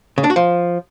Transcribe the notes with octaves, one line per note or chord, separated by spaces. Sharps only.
C#3
D4
F#4
F3